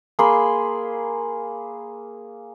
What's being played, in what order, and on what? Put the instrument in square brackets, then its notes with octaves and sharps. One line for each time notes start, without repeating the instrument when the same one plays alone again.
[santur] A#3 G#4 B5 C6